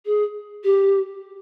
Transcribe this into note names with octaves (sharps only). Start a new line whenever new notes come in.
G#4
G4